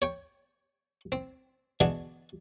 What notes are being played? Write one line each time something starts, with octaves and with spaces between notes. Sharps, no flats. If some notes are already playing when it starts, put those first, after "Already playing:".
C#5 G5
C4
B2 D3 E3 D4 G#4